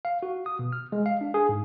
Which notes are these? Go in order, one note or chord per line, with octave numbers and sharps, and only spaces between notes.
F5
F#4
D#6
B2
F6
G#3
F5
D4
G#4
G#2